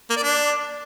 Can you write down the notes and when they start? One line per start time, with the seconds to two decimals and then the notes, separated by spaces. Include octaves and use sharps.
0.10 A#3
0.16 D5
0.23 D4